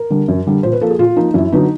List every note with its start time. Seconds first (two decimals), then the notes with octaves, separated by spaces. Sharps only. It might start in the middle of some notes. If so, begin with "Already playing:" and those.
Already playing: A#4
0.10 D3 G3
0.28 F#2
0.47 D3 G3
0.63 A#2 C5
0.73 B4
0.81 F3 A#3 A4
0.90 G#4
0.99 A#2 F4
1.16 F3 A#3 D#4
1.34 F#2 E4
1.52 D3 F#3 B3 D#4